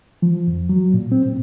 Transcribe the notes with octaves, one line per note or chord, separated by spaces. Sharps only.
F3
F2
F#3
A#2
C4
A#2